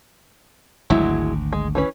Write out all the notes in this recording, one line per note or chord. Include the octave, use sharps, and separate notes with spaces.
G#1 D2 F#3 G#3 E4
G#3
E3 C#4 B4